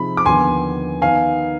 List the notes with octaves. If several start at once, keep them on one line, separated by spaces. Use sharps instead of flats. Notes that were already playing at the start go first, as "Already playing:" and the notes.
Already playing: C3 F3 C4 D#4 G#4 B5
D6
D#2 D3 F3 B3 G#5 C6
D#3 B3 D#4 F5 G#5